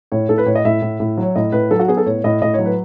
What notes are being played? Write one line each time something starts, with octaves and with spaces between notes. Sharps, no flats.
A2 C#5
A2 A4
B4
A2 C#5
D#5
A2 E5
A2
A2
F#3
C#5
A2 D#5
A2 B4
F#3 A4
F#4
B3 G#4
A4
A2 C#5
A2 D#5
A2 D#5
F#3 C#5
B4